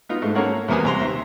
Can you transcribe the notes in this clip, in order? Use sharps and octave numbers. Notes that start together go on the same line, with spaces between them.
B3 D#4 F4
G#2 A3
A#3 C#4 A4 A#4 C#5 F#5
E2 C3 A#3 B3 G#5
C2 A#5 C6
D#2 E5